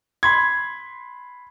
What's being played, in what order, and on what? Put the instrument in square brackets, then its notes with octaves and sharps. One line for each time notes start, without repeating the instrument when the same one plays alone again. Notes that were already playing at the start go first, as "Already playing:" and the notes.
[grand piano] B5 C6 G#6